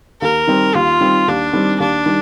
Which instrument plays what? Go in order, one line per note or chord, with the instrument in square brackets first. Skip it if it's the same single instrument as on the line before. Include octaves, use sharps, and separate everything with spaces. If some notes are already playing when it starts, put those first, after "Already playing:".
[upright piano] D#2 [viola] A#4
[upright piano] D#3 G3 C4
[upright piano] D#2 [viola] F4
[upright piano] D#3 G3 C4
[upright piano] D#2 [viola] D4
[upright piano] D#3 G3 C4
[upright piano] D#2 [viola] D4
[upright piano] D#3 G3